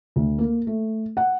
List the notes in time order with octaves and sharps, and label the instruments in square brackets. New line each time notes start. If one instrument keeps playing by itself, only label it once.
[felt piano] D2
A#3
A3
F#5